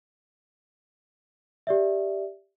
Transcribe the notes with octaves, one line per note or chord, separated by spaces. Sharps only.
G4 D5 E5